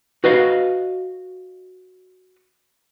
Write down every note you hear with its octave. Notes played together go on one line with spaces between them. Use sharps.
F#4 B4 D#5 F5